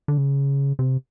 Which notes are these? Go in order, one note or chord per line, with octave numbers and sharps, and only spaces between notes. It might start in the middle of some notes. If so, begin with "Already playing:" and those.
D3
C#3
C3